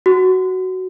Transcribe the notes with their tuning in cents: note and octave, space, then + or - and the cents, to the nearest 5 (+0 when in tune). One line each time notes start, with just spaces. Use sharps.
F#4 +10